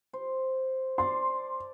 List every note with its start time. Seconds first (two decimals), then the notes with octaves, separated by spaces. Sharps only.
0.13 C5
0.98 D5 A5 C6